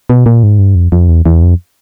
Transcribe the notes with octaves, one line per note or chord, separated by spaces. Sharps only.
B2
A#2
G#2
G2
F2
F2
E2
E2
F2